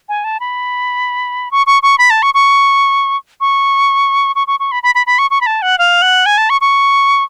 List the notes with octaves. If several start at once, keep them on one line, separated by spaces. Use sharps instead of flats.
G#5
A5
B5
C#6
C#6
C#6
B5
A5
C#6
C#6
C#6
C#6
C#6
C#6
B5
B5
B5
B5
C#6
C#6
B5
A5
F#5
F5
F#5
G#5
A5
C#6
C#6